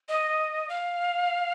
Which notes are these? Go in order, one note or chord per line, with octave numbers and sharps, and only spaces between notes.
D#5
F5